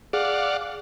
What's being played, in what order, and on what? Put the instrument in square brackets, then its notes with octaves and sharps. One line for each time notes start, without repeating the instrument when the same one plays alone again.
[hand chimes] G#4 [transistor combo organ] D5 F5 F#5